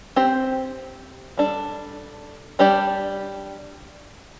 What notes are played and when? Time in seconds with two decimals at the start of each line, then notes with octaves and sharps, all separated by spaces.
0.16 C4 G4 C5
1.37 G3 D4 A4
2.59 G3 D4 G4 D5